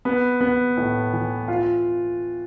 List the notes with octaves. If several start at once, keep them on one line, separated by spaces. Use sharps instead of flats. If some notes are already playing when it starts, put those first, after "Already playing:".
B3
B3
A2
E3
F4